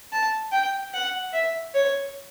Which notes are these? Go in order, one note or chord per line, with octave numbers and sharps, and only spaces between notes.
A5
G5
F#5
E5
C#5